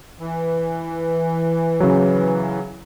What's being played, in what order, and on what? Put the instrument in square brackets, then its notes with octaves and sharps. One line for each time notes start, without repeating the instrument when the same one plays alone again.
[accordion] E3
[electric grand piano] C#3 F#3